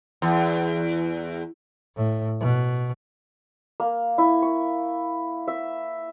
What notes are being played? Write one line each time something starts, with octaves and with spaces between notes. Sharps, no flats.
E2
A2
B2
A#3
E4
C#6
E5